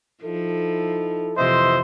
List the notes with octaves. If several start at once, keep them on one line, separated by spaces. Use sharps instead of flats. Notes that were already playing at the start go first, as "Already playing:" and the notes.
F3 D#4 E4 A4
F2 C3 E3 F3 C5 D#5 E5 C6